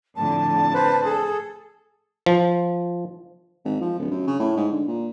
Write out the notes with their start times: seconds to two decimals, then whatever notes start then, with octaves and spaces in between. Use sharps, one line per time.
0.16 F2 A2 D3 A5
0.74 B4 C5
1.04 G#4 A4
2.26 F3
3.65 G#1
3.81 F3
3.99 D1
4.11 F#2
4.27 C#3
4.39 A2
4.56 G#2
4.72 D3
4.87 A#2